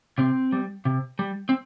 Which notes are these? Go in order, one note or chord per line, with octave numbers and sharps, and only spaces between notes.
C3 C4
G3
C3
G3
C4